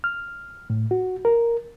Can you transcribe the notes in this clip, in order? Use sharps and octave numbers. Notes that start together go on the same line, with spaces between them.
F6
A2
F#4
A#4